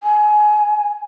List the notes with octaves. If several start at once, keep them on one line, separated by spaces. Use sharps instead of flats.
G#5